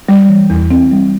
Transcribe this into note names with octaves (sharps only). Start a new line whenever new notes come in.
G3
E3
E2
C4
G3